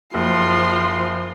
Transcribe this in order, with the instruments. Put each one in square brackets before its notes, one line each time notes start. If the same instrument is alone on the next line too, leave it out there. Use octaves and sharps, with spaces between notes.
[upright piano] F#1 [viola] F3 [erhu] C6